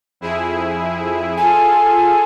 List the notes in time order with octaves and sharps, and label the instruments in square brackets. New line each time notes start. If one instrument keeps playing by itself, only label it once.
[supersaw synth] F2 E4 G#4
[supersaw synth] F4 G#4 A4 [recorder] G#5